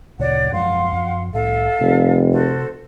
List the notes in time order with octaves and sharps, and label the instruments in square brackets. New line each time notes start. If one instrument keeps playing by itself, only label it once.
[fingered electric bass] D2 A#2 C#3 [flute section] C#5 D5 F#5
[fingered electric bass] F#2 F3 G#3 [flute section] F5 F#5 C6
[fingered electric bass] F#2 F3
[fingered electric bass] C2 A2 [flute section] A4 E5 F5
[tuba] F1 [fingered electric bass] C3
[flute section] F#4 A4 C5